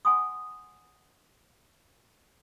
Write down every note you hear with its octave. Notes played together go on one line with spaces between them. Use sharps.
F#5 G#5 C6 D#6